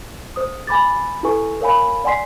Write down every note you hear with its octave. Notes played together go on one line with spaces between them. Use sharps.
C5 D#6
G#5 B5 D6 A6
E4 G4 A4 B4 G#5 C#6
A#4 C#5 F5 G#5 B5
D5 F#5 G#5 C6 B6 C7